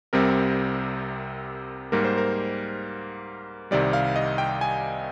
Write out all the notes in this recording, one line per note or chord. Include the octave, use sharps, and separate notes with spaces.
C2 C3 G3 C4 A#4
G#2 G3 A#3 A#4
C5
A#4
C2 C3 D#3 G3 D5
F5
D#5
G5
G#5